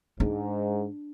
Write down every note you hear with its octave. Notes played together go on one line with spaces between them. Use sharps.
G#2 D4